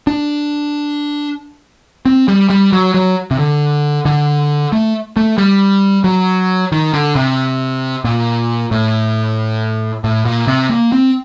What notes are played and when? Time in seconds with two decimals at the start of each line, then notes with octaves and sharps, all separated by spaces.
0.07 D4
2.05 C4
2.28 G3
2.50 G3
2.72 F#3
2.94 F#3
3.31 C3
3.38 D3
4.05 D3
4.72 A3
5.16 A3
5.38 G3
6.04 F#3
6.72 D#3
6.94 D3
7.15 C3
8.04 A#2
8.71 A2
10.04 A2
10.25 A#2
10.47 C3
10.69 A#3
10.92 C4